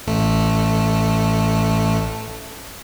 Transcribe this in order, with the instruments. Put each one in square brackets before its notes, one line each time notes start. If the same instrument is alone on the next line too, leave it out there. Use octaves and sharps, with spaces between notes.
[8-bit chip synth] A1 A3